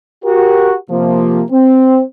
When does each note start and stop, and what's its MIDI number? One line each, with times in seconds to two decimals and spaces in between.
0.25 0.74 66
0.25 0.74 67
0.25 0.74 70
0.91 1.43 48
0.91 1.43 53
0.91 1.43 58
1.51 2.02 60